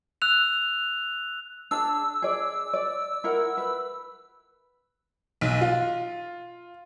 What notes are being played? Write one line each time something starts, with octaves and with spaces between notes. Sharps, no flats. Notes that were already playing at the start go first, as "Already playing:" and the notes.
E6 F#6 F7
D4 G#4 A5 E6
G#4 D5
D5
E4 A#4 F#5
B4
B1
F4